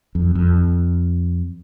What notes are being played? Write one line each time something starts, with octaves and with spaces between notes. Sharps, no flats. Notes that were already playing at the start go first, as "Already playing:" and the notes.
F2
F2